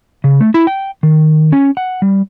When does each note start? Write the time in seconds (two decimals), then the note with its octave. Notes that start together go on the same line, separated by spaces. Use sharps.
0.24 C#3
0.41 A3
0.54 E4
0.67 G5
1.03 D#3
1.52 C#4
1.77 F#5
2.02 G3